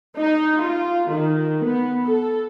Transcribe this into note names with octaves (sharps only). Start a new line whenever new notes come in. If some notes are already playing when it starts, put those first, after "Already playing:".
D#4
F4
D#3
B3
A4